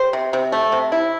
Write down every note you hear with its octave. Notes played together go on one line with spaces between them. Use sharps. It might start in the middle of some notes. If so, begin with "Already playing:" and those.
Already playing: G4 C5
C3
C3
A3
C3
E4